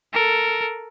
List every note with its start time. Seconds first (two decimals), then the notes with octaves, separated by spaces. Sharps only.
0.13 A4 A#4